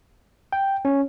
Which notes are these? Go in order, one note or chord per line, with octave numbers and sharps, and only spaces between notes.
G5
C#4